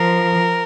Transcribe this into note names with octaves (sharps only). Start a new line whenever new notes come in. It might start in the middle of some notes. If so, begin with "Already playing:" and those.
Already playing: F3 A#4